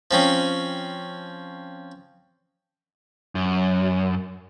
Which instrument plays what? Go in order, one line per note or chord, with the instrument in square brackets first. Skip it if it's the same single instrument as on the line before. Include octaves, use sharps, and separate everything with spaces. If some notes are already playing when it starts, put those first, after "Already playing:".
[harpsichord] F3 C4 C#4
[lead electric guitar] F#2